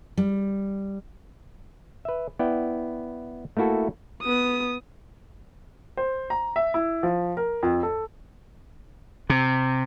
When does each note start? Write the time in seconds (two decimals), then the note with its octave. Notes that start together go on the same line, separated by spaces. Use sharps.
0.17 G3
2.05 B4 E5
2.39 B3 E4 D5 G5
3.57 A3 A#3 E4 F#4 A4
4.22 B3 D#6
5.97 C5
6.30 A#5
6.56 E5
6.74 E4
7.03 F3
7.37 A#4
7.63 F2
7.83 A4
9.30 C3